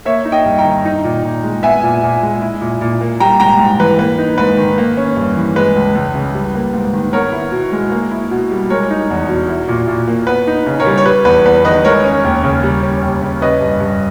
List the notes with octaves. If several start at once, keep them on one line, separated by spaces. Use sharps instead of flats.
A#3 C#5 E5
D#4
D#5 G5
G2
G5 A#5
D#3
D#4
A#2
A#2
G#3
B3 E5 G#5
A#2
A#2
G#3
E4
A#2
A#2
A#3
G3 G5 A#5
G#2 G5 A#5
G#2
E3 B4
A#3 B4
D#4
G#2 B4
D#3
A#3
C#4
G2
E3
G#3 B4
C#2
C#2
C#3
G3
A#3
G#2
D#3
B3 A#4 C#5
E4
B2
G#3
A#3
E4
B2
G3
G#3 A#4 C#5
D#4
E2
B2
E4
A#2
A#2
A#3
B3 B4
D#4
C#3
A#4 C#5
G3
C#5
G3 B4
E2 B4
E2 B4
D#3 B4 D#5
G#3 A#4 C#5
C#4
D#2
C#3
G3
C#4
D#2
C#3
C#4 B4 D#5
G2
G2